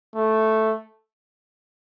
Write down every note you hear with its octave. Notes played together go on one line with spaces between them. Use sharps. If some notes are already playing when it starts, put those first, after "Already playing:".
A3